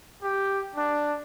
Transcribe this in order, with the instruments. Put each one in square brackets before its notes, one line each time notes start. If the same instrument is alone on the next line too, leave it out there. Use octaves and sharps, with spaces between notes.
[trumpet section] G4
D4